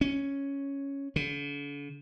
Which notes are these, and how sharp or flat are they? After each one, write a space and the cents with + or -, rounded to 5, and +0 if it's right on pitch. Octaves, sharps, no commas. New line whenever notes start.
C#4 +0
D3 -45